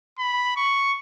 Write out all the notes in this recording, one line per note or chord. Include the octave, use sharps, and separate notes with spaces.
B5
C#6